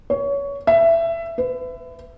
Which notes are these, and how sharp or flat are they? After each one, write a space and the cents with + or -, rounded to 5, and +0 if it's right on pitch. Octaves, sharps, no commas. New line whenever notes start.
C#5 +20
E5 +15
B4 +35